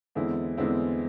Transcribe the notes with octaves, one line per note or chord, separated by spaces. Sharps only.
E2 D3 G#3 C4 E4
E2 D3 G#3 C4 E4